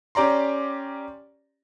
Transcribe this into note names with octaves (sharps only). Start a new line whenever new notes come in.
C#4 G4 D5 A#5 C6